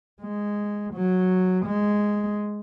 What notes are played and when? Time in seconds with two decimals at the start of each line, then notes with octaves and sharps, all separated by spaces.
0.21 G#3
0.94 F#3
1.65 G#3